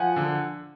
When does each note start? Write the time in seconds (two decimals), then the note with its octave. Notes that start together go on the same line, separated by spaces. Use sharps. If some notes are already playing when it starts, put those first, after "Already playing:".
Already playing: F3 F#5 G#5
0.16 D3